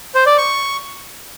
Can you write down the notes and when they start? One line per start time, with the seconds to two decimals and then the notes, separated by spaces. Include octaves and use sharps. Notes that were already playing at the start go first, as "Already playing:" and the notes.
0.15 C5
0.26 D5
0.38 C#6